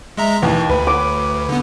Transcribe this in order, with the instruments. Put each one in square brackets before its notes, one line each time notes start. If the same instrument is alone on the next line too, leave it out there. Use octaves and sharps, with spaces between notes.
[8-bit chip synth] G#3 E5 A#5
[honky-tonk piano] D#2 [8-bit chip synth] E3
[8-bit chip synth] D2 [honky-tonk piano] B4
[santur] D6
[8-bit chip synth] D3 B3